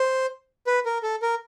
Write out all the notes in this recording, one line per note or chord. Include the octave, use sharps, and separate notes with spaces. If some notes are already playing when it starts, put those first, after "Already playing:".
Already playing: C5
B4
A#4
A4
A#4